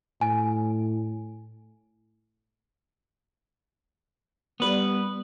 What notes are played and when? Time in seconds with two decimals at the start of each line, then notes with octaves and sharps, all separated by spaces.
0.21 A2 G#5
4.60 G3 B3 B4